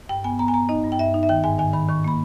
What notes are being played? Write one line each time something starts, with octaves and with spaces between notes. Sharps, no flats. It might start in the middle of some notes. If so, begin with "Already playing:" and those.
G2 G5
B3 G#5
B3 A#5
G#5
B3 A#5
D#4 D#5
G2
G5
G2 E5
D#4
E5
D#3 G5
G#2 G#5
D#3 G#5
D#3 B5
D#3 C#6
A#3 B5